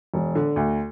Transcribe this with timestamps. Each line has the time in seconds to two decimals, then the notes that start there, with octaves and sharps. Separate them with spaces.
0.14 E1
0.35 D3
0.56 D2